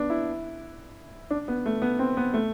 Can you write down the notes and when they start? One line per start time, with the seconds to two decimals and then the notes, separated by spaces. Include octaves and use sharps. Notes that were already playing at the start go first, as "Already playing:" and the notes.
Already playing: B3 D4
0.10 E4
1.30 D4
1.48 B3
1.66 A3
1.82 B3
1.99 C4
2.17 B3
2.34 A3